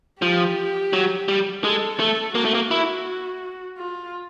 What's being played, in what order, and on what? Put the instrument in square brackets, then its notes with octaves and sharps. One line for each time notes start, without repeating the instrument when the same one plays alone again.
[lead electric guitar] F3 [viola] G4
[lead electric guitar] F#3
G3
[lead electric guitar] G#3 [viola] A4
[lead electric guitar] A3 [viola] A4
[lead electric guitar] A#3 [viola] F#4
[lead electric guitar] A3
A#3
E4
[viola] F4